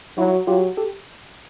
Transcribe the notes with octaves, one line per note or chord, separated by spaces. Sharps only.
F#3 E4 F#4
F#3 F4 G4
G4 A4